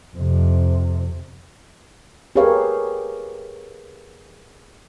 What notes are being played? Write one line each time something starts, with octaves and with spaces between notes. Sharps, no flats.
F2 C3
G4 G#4 A#4 B4 C#5 F5